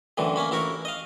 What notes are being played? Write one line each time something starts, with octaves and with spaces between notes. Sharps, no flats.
F#2 A2 D3 E3
A#3 C#4 B5
A1 E4 F#4 A#4 C#6
D#5 F5